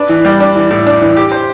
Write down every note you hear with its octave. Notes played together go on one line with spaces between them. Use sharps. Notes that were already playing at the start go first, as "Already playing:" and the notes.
Already playing: D4 B4
E3
G3
D4
E3
A2
D4
E3
G4
C5